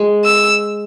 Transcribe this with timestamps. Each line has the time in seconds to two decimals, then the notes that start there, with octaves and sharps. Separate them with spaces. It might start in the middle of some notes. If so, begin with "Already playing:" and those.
Already playing: G#3
0.25 E6